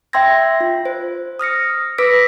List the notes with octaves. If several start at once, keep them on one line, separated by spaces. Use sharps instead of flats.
E5 G5 C6 E6 G#6 A#6
F4
C5
D#6 F6 A#6 C#7
B4 D6 E6 A#6 B6 D7